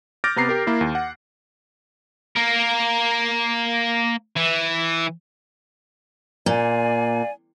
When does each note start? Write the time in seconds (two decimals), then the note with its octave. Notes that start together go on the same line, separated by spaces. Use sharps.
0.24 D6 F6 G6 A6 A#6 D7
0.36 C3 B3 A#5 C7
0.49 G4 A#4
0.67 A#3 E4
0.81 D#2
0.95 F#5
2.36 A#3 A#4
4.37 E3
6.46 A#2 D5 F5 G#5